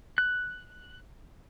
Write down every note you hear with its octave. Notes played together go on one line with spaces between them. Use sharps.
F#6